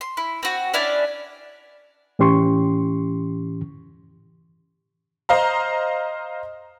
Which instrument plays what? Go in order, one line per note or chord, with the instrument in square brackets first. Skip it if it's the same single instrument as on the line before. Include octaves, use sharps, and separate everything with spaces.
[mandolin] C6
E4
C4 F#4
C#4 D4 E4 D5
[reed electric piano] A2 E3 C#4 G4 C6 C#6
[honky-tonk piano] C5 D#5 F5 A#5